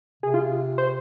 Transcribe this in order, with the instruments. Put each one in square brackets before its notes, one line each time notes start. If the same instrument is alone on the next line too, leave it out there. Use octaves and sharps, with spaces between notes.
[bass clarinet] C3 [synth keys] G#4
[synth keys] F4
C5